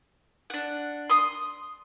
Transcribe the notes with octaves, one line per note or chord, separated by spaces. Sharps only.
D4 F#5
C6 D#6